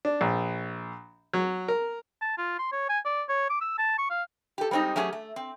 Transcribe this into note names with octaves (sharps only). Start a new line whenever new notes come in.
D4
A#1
F#3
A#4
A5
F4
C6
C#5
G#5
D5
C#5
D6
E6
A5
C#6
F5
G4 A4
G3 G#3 C4 D4 D#4
F#3 A3 C#4 G4 G#4
A3
C4